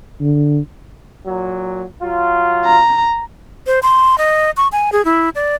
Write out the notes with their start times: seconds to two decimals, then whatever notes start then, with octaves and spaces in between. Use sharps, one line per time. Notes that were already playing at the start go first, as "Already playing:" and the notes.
0.21 D3
1.25 A#2 F#3
2.02 F#3 F4
2.66 A#5
3.67 C5
3.83 C6
4.18 D#5
4.57 C#6
4.72 G#5
4.92 G#4
5.05 E4
5.35 D5